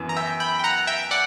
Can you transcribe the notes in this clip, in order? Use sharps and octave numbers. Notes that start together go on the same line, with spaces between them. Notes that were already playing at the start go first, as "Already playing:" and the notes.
Already playing: F#2 E3 B3
A#5
E5 G5
G5 B5
G5
F#5 A#5
E5 G5
D5 F#5